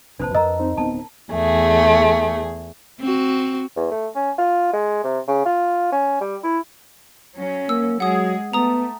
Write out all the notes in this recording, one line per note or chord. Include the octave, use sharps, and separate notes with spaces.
F1 A#1 C4 D4 B4 C5 A5
F2 A#4 D#5 A#5 E6
C4 D#4 C5
D1 B3 C#4 A5
E2 A3 G#4
C4 F#4
E2
A3
C#4
F4
G#3
C3
C#3
F4
C#4
G3
E4
F#3 C#4
A#3 E6
F#3 G#3 G#4 F#5 D#6
A3 B3 A#5 D#6